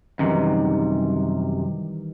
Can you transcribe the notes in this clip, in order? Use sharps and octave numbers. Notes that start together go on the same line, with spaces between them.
F#2 C3 D#3 E3 G3